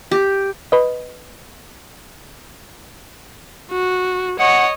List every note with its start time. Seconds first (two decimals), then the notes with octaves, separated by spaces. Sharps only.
0.11 G4
0.72 B4 D#5
3.71 F#4
4.39 C#5 D#5 F#5